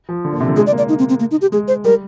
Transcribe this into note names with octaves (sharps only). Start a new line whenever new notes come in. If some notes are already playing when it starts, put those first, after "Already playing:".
F3
D3
A#2
C3
D3
G#3 G#4
D5
A#3
D5
D#4
C4
C4
A#3
D#4
G4
G#3 G#4
C5
G3 A#4